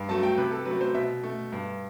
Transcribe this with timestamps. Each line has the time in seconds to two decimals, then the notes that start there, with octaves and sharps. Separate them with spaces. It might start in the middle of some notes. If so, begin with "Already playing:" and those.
Already playing: G2
0.09 F#3 A3 A5
0.23 G5
0.38 C3 B4
0.51 A4
0.65 F#3 B4
0.71 A3
0.81 C5
0.94 B2 E5
1.23 A3
1.52 G2